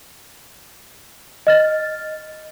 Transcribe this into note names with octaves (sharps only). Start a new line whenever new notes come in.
D#5 F6 A6